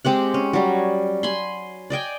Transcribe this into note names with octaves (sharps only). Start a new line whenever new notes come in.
G#3 C4 G4 F#5
C#4
F#3 G3
G#5 B5 C6
D5 D#5 G5 G#5